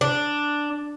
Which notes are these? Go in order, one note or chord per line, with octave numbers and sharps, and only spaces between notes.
D4